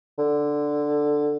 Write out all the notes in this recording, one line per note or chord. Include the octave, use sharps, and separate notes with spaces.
D3